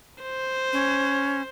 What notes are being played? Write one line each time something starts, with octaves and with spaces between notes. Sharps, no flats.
C5
C#4